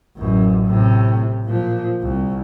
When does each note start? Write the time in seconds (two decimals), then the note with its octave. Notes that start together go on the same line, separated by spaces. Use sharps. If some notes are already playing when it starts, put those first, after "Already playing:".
0.17 A1 F#2
0.66 A2 C3
1.45 A#2 F3
2.02 C2